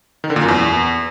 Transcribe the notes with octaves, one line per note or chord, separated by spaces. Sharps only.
D#3
D3
A#2
F#2
E2